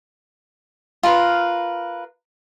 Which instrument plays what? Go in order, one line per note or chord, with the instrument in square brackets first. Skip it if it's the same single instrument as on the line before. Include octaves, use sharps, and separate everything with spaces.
[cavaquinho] F4 A#4 B4